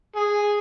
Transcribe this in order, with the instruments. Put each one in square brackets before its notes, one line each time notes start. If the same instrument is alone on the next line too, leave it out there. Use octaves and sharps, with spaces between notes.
[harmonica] G#4